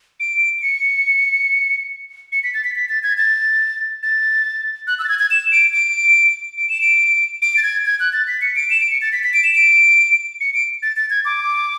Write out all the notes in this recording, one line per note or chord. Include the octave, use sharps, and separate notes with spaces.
D7
D7
C#7
C#7
B6
A6
B6
B6
A6
G#6
A6
A6
F#6
E6
A6
G#6
G#6
E7
D7
D7
D7
E7
D7
D7
A6
G#6
G#6
F#6
A6
B6
C#7
D7
E7
D7
C#7
A6
B6
B6
D7
E7
D7
C#7
D7
A6
A6
G#6
D6